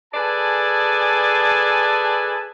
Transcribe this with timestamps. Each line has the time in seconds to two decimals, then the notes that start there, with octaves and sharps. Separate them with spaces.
0.14 G#4 A4 B4 D5 G#5 A5